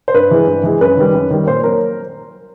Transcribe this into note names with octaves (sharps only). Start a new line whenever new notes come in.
C5
G2 B4
E3 G#3
G2
E3 G#3
F#2 B4
D#3 G3
F#2
D#3 G3
A#2 C5
F#3 A#3 A#4